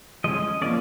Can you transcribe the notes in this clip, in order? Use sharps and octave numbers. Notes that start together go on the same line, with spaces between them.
F3 G#3 C#4 D#5
F3 A#3 C#4 D5